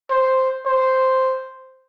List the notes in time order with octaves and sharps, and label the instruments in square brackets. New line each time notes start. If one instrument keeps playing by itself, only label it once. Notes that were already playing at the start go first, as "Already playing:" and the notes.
[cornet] C5
C5